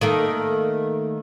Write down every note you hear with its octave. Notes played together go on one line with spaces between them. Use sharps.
D#3 A3 A#3